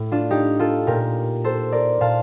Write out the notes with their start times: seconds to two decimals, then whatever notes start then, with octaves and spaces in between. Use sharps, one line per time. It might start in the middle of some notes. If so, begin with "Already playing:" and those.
Already playing: A2
0.12 D4 F4
0.31 D#4 G4
0.59 F4 A4
0.87 A#2 G4 A#4
1.44 A4 C5
1.72 A#4 D5
2.01 A#2 F5 A5